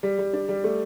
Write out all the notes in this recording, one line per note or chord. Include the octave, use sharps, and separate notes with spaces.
G3
G3
D4
G3
A3